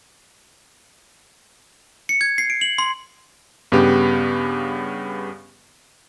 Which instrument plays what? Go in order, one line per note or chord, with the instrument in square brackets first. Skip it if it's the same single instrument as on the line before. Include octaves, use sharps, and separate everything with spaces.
[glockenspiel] C#7
G#6
C7
D7
F#7
C6
[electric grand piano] G2 C#3 B3 G4